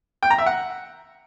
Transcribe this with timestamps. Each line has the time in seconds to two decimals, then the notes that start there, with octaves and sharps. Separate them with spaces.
0.23 G5
0.30 A#5
0.38 E5
0.46 F#5